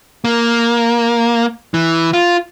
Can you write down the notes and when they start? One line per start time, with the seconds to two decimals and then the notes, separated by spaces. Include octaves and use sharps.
0.25 A#3
1.74 E3
2.13 F4